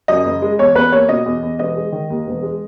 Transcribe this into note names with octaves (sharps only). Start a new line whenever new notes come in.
F#2 D#5
F#1
G#3
E2 C#5
E2 B4
A#3 C#5
B2 D#5
E2
E2
E1 D#5
G#3
D#3
D#2
E1
G#3